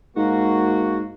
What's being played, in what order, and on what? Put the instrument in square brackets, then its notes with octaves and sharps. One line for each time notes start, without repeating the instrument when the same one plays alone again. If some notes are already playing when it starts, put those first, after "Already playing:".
[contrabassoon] G#2 [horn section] A#3 F#4